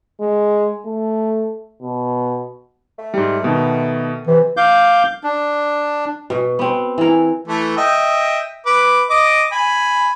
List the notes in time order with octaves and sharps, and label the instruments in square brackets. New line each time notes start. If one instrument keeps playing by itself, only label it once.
[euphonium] G#3
A3
B2
[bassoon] A3
[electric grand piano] G#2 G3
B2 D#3 B3
[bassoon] C3 [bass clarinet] E3
[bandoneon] F5 D6 G6
D4
[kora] B2
B3 C4
E3 A#4
[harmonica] E3 A3
D#5 E5 G5
B4 D6
D#5 D6
G#5 B5